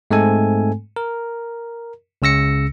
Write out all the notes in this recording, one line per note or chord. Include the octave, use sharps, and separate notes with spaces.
G#2 G#3 A3 C4 A4 G#5
A#4
C#2 C#3 E6 A#6 C#7